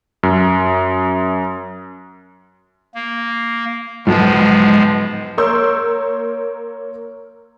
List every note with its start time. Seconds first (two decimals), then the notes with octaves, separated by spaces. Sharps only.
0.23 F#2
2.95 A#3
4.07 B1 G#2 F3 G#3 B3
5.37 A#3 A#4 C#5 C6 E6 G6